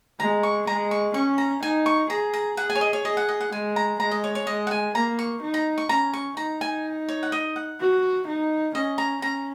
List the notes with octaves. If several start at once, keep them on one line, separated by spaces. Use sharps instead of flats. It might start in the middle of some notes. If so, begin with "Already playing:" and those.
G#3 A#5
C#6
G#3 A#5
C#6
C#4 C#6
A#5
D#4 G#5
C#6
G#4 A#5
A#5
G#4 F#5
G#5
C#5
D#5
C#5
G#4 D#5
F#5
D#5
F#5
G#3 G#5
A#5
G#3 A#5
D#5
C#5
C#5
G#3 D#5
F#5
G#5
A#3 A#5
C#6
D#4
A#5
C#6
C#4 A#5
C#6
D#4 A#5
G#5
C#5
F#5
D#5
F#5
F#4
D#4
C#4 D#5
A#5
C#4 A#5